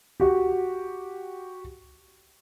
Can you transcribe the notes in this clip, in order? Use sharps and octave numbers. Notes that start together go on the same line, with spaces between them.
F#4 G4